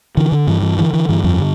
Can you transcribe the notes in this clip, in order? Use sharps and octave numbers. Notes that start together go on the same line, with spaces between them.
D3 E3
D3
G2 E3
E3
D3 E3
E3
G2 E3
F2 F3
D3